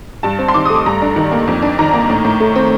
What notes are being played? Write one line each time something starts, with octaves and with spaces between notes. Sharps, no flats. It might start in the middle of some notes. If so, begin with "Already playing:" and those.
G2 A5
C4
C6
D#3 D6
D#6
A3
D6
G2 A#5
D4
D#3
A#3
F2
D4
D#3 A#5
A#3
A2
A2
A3
C4